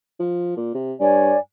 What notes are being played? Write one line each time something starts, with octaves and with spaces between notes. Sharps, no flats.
F3
A#2
C3
G2 C#5 D5 G#5